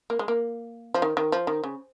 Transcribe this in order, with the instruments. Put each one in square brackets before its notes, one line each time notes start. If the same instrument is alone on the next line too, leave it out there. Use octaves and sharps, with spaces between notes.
[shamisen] A#3
G#3
A#3
F3
D#3
D#3
F3
D#3
C#3